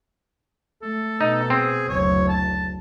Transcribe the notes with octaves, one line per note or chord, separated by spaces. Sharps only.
A3 A4
B2 D#4
C4 G#4
F#1 D2 C#5
A5